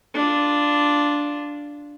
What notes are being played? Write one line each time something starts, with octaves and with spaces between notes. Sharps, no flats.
D4 F4